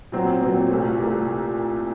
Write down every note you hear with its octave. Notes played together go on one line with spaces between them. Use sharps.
A#2 F#3 C4
A#2 F#3 C4
C2 A#2 A3
C2 A#2 A3